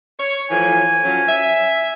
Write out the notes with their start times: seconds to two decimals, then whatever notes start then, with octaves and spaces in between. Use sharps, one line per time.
0.19 C#5
0.51 A2 E3 F3 G#5
1.05 F3 F#3 C#4
1.28 E5